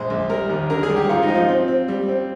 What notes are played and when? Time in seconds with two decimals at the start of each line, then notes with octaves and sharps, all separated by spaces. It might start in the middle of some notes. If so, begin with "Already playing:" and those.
Already playing: A#1 G#3 C5
0.10 A#1
0.29 G3 A#4
0.49 D#2
0.70 D3 A#4
0.83 G#4
0.89 G3
0.96 G4
1.09 G#2 F4
1.23 D#4
1.28 F3
1.35 F4
1.49 C4
1.68 C4
1.88 G3
2.08 C4